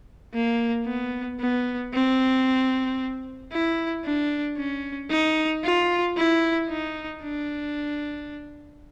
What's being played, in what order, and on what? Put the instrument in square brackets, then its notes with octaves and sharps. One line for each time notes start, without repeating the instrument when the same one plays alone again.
[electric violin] A#3
B3
B3
C4
E4
D4
C#4
D#4
F4
E4
D#4
D4